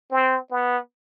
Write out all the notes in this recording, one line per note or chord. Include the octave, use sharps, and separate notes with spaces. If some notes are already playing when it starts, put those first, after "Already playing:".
C4
B3